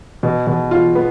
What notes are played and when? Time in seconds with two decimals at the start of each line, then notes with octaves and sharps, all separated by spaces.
0.23 B2
0.47 B2
0.71 F4
0.95 B3